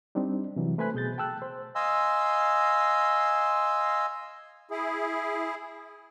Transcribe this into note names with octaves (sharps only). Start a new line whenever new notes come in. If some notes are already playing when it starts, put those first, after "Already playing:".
G3 C4 D4 D#4
C3 E3 F#3
A3 B4 C5 G#5 B5 F#6
B2 G#4 G6 A6
G5 A5 E6 F#6
C5
D#5 F5 G#5 C6 E6
E4 G#4